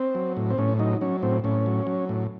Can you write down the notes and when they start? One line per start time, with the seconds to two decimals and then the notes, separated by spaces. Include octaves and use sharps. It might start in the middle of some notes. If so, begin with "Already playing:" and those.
Already playing: C4
0.15 F#3
0.37 A2
0.50 C4
0.58 A2 C#4
0.79 F#3 D#4
1.01 F#3 C#4
1.22 A2 C4
1.44 A2 C#4
1.66 F#3
1.87 F#3
2.09 A2